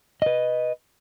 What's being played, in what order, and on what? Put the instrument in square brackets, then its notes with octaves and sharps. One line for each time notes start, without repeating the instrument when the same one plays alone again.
[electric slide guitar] B4 D#5